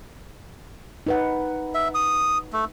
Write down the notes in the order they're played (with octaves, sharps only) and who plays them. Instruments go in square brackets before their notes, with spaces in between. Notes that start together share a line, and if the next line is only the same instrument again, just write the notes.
[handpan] D#4 B4 F#5
[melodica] E5
D#6
A3